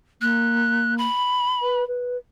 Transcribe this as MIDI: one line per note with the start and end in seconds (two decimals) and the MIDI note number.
0.21 1.07 58
0.21 0.97 90
0.98 1.82 83
1.62 1.87 71
1.88 2.17 71